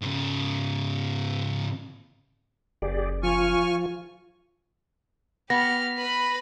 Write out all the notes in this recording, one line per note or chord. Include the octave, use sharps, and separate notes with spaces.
G#2 C#3
F#1 G4 G#4 D5
F3 F4 G#5 C#6 F6
B3 G4 F6 A#6
B4 B5